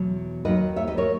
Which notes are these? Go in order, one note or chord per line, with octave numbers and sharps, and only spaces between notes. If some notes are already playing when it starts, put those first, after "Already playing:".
Already playing: E2 B2 F#3
D#2 D#3 F#3 B4 D#5
C#5 E5
B4 D#5
A#4 C#5